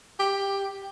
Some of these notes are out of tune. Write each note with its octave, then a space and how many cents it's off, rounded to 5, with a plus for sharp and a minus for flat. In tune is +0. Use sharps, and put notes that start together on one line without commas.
G4 +10